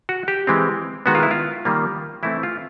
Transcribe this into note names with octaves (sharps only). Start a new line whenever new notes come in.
F#4
G4
E3 G#3 C4
D#3 G#3 B3 F#4
F4
E4
F4
D#3 G3 A#3
E3 A3 C4 E4
F4